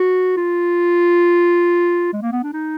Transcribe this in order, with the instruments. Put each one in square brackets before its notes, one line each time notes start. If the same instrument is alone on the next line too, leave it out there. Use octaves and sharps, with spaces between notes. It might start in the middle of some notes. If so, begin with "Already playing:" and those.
Already playing: [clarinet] F#4
F4
G#3
A#3
B3
D4
D#4